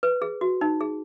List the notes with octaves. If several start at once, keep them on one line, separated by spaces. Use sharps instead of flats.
B4
G#4
F#4
D#4
G#4